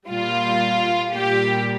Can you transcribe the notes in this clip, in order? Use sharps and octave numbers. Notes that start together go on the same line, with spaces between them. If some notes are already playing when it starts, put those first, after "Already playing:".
A#2 G3 F4
A#2 G3 G4